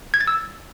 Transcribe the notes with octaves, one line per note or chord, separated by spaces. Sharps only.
G#6
A6
E6